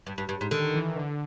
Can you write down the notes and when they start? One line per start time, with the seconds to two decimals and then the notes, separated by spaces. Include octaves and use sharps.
0.07 G2
0.18 G2
0.29 G2
0.41 G#2
0.51 D3 D#3
0.74 E3
0.96 D3